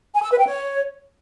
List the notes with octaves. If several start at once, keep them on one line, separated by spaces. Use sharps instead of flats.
G#5
E6
B4
G5
C#5